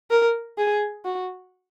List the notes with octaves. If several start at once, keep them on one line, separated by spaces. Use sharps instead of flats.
A#4
G#4
F#4